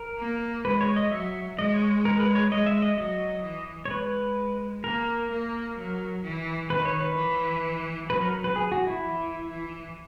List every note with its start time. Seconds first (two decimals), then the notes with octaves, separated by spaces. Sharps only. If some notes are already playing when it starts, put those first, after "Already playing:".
Already playing: A#4
0.19 A#3
0.65 G#3 B4
0.81 C#5
0.96 D#5
1.12 F#3 E5
1.58 G#3 D#5
1.74 C#5
2.05 A#4
2.20 B4
2.35 C#5
2.51 G#3 D#5
2.66 E5
2.82 D#5
2.98 F#3 D#5
3.44 E3
3.85 C#5
3.91 G#3 B4
4.84 A#3 A#4
5.31 A#3
5.77 F#3
6.23 E3
6.70 D#3 B4
6.85 C#5
7.00 B4
7.16 E3
8.09 F#3 B4
8.21 A#4
8.44 B4
8.56 G#4
8.72 F#4
8.87 E4
9.02 E3
9.49 E3